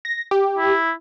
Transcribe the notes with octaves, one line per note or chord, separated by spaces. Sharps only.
A#6
G4
E4